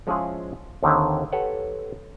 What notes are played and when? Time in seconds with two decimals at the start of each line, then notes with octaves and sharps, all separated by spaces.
0.07 F3 G#3 C#4 E4 F4 G#4
0.83 D#2 D3 D#3 C4 E4
1.32 G4 A4 B4 C#5 F#5